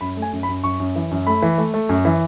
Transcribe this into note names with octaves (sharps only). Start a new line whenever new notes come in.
F#2 B5
A3
G#5
F#2
B5
F#2
F#2 C#6
F#2
E3
F#2
A3 B5
E3
A3
A3
F#2
E3